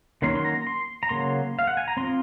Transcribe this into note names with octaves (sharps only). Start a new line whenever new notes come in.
D#3 F#3 A#3 C#4 C6
C6
A#5
C6
A#5
C#3 F#3 A#3 C6
F5
F#5
G#5
A#5
F3 C4 C6